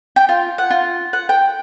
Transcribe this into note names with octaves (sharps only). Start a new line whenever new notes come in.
G5
F4
F#5
F4
F#5
G5